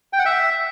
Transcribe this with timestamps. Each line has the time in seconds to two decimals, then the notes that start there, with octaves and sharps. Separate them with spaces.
0.13 G5
0.19 F#5
0.26 E5